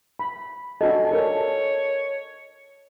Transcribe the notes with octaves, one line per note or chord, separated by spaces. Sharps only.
B5
D4 F#4 A4 D#5 G#5
A4 A#4 C#5